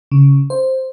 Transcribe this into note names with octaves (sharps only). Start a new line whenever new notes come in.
C#3
C5